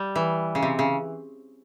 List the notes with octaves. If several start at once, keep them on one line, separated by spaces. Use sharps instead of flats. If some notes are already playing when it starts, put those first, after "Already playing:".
Already playing: G3
E3
C#3
C3
C#3